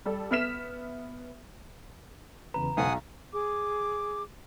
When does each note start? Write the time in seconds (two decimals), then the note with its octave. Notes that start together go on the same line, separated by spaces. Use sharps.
0.05 G3 A4
0.31 B3 E5 F6 B6 E7
2.54 E2 C#3 B4 A#5
2.77 B1 F#5 G#5 D#6
3.32 G#4 D6